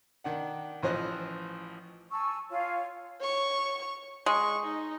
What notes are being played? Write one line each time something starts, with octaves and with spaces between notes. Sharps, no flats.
D#3 D4 F#5
A1 E3 F3 C5 D#5 F#6
G#5 A5 C#6 E6
F4 C#5 F5 G#5
C#5 C#6
G#3 C#6
D#4